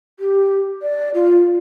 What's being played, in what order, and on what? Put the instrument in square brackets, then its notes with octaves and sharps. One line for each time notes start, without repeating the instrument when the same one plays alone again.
[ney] G4
D5
F4